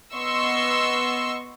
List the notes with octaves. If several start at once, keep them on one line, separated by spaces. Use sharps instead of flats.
B3 D#5 C6 C#6 E6